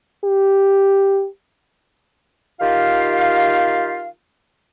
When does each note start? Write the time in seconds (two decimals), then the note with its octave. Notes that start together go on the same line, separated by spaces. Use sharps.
0.24 G4
2.60 D#3 F4 G4 F5